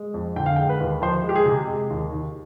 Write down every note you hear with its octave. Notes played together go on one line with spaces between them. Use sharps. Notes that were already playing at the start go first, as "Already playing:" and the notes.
Already playing: G#3
F2
D3 G5
F5
G#3 G5
B4
D#2
F3 C5
G#3
G4
G#4
C3
G#3
D#2
D#3